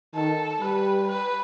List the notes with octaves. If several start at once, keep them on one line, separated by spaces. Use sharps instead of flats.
D#3 A4
G3 B4
B4